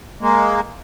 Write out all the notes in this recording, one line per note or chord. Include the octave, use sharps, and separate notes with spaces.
G#3 A#3